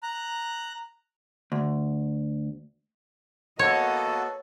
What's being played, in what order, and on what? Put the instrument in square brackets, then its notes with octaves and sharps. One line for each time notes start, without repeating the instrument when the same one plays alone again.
[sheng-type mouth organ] A#5 F#6
[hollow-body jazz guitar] D2
[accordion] A#3 B3 F#4 [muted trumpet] A4 [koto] C#5 [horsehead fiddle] D#5